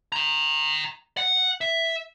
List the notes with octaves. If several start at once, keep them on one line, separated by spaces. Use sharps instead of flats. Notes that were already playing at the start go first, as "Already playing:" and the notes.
G5 A#5
F#5
E5